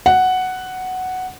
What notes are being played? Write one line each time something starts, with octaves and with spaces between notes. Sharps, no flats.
F#5